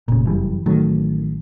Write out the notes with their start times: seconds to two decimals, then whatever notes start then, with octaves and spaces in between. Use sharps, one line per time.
0.08 F1 A#2 C#3
0.25 F#2 E3 G3
0.66 A1 D#3 F#3 A3